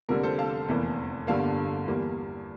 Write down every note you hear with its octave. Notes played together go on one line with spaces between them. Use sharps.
F1 F2 D3 G3 A#3 A#4
A4 C5
F5 A5
F1 E2 E3 A#3
G1 G2 D3 G3 A#3 F5 A5
E2 E3 G3 A#3